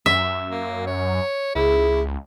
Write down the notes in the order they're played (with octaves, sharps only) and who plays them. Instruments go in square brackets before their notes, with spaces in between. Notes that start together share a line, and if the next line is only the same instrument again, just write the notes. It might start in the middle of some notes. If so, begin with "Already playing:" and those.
[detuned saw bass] F#2 [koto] E5
[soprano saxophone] A#3
C#5
[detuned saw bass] C#2 [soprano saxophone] E4 [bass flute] G#4